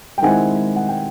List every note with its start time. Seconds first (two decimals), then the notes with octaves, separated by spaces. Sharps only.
0.18 G5
0.22 D#3 G#3 C4 E4 F#5 G#5
0.76 F#5
0.88 G5